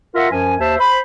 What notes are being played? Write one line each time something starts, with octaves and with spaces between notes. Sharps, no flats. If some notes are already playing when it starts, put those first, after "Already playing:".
F4 A#4 E5 F#5
F#2 F3 G#5
D#2 C5 E5 A5
C5 B5